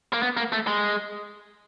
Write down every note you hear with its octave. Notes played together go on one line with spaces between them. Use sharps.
A#3
B3
A#3
A3
G#3